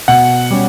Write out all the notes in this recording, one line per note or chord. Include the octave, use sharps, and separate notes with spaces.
B2 F#5
G3 C#4